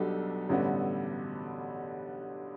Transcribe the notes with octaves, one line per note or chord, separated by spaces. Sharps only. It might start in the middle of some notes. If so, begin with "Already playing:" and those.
Already playing: B1 B2 G3 B3 D4 A4
A1 G2 D3 G3 B3